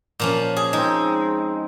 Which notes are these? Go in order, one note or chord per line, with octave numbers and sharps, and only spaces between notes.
A#2 F3 C#4
G#4
G#3 C4 D#4